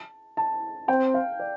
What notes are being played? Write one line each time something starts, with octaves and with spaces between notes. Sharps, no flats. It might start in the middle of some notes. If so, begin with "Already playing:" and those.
Already playing: A5
A5
C4 G5
F5
D5